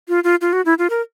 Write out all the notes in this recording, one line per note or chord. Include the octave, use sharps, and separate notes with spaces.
F4
F4
F4
F#4
E4
F4
A#4